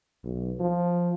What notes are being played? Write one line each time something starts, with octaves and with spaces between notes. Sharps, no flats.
B1
F3